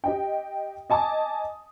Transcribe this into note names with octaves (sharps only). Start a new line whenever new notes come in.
G4 D#5 G5
D#5 G#5 A5 D6 D#6